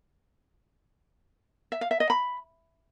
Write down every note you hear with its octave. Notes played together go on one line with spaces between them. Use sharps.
E5
F5
E5
D#5
B5